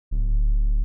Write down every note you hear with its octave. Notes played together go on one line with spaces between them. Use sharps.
D1